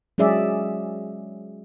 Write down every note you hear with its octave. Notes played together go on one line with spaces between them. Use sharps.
F#3 G#3 C#4 G#4 D5 E5